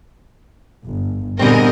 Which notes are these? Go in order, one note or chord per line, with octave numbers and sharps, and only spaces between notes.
G1
A#2 D3 G3 B3 C4 G#4 A#4 D#5